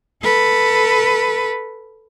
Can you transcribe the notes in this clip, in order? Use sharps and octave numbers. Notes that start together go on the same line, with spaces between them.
A4 B4